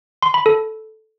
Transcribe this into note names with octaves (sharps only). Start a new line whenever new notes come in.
C6
B5
A4